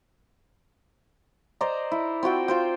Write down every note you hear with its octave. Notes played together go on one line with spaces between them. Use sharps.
C5 D5 D#5 A#5
E4
C4 F4 F#4 G5
F4 C5 G5